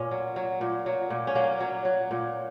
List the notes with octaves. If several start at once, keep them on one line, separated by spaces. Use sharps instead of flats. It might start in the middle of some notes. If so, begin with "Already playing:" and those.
Already playing: A#2 C#4
F#3
F#3
A#2
F#3
A#2
C#4
F#3 A#3
F#3
F#3
A#2